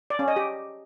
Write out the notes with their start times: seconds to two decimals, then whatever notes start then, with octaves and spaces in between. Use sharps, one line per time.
0.10 D5
0.19 C#4
0.28 D#5
0.36 G4